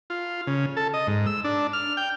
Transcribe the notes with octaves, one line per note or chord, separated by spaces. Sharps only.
F4
C#3
A4
D#5
G#2
E6
D4
F6
G5